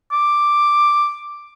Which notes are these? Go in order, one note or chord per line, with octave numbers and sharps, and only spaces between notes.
D6